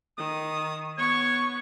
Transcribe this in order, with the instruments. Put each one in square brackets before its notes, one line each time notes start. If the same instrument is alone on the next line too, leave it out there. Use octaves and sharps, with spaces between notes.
[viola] D#3 [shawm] D#6
[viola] B3 C#6 [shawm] C#5